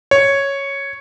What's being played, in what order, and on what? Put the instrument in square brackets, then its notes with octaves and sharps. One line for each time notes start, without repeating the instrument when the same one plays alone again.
[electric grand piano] C#5